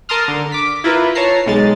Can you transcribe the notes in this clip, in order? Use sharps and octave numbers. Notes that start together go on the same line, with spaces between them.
A#4 A5 A#5 C6 D#6 F6
D3
D6 B6
E4 F4 A#4 B4
C#5 A5 A#5 C7
B1 G#3 A6